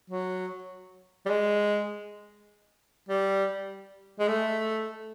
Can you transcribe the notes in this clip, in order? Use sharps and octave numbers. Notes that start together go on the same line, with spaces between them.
F#3
G3
G#3
G3
G#3
A3